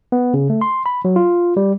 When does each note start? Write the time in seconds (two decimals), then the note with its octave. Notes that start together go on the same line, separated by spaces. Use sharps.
0.12 B3
0.34 C#3
0.50 A3
0.61 C6
0.86 B5
1.05 F#3
1.16 F4
1.57 G3